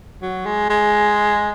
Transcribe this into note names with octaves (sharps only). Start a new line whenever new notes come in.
F#3
G#3
G#3